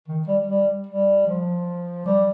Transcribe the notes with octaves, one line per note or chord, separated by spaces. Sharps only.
D#3
G3
G3
G3
F3
G3